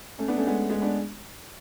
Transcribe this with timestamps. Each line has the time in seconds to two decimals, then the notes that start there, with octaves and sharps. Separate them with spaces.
0.18 A3 C#4
0.28 B3 D4
0.37 A3 C#4
0.47 G#3 B3
0.70 G#3 B3
0.81 B3 D4